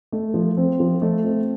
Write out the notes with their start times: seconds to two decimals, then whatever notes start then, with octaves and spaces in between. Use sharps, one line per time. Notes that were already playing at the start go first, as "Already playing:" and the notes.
0.12 A3
0.34 F3
0.57 C4
0.80 F3
1.02 A3
1.24 C4